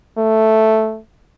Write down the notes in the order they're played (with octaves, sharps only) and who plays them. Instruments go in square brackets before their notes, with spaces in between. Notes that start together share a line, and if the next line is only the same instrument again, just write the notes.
[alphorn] A3